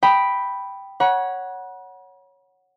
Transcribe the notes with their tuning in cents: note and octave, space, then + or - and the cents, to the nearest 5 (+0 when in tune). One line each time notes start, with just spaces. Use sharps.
G5 +0 B5 +0 D#6 +0
C#5 +0 F#5 +0 B5 -45